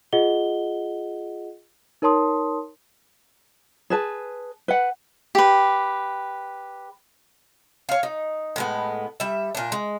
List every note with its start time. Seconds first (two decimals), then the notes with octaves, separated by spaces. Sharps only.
0.13 F4 G#4 D#5 F#5 G7
2.02 D#4 A#4 C#5 A5 C6 D#6
3.90 G#4 B4 A5
4.68 B4 F#5
5.35 G4 B4
7.89 C#5 F5
8.03 D#4
8.56 A2 G#3 B3
9.20 G3 E5
9.55 A#2 D4
9.72 G#3